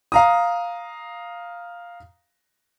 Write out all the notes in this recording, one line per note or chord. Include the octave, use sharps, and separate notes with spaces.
F5 A#5 D#6